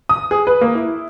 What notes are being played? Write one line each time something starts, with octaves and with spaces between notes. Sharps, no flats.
D#6
G#4
B4
A#3
E4